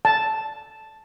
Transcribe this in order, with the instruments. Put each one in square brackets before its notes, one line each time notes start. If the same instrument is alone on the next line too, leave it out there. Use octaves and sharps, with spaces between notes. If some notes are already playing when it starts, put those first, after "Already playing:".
[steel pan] A5